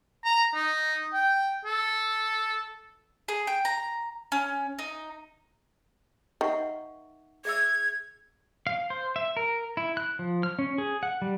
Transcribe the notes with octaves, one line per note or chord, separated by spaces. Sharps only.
A#5
D#4
G5
A4
G#4
G5
A#5
C#4
D#4
D#3 E5 F#5 C#6
G#4 E5 E6 G#6
F5
C5
E5
A#4
E4
F#6
F3
F6
C#4
G#4
F#5
G3